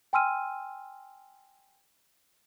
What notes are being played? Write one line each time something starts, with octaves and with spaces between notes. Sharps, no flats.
G5 G#5 C6 E6 F6 D#7